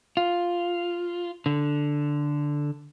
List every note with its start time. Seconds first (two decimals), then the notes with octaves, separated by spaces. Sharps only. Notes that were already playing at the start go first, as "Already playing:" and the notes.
0.17 F4
1.46 D3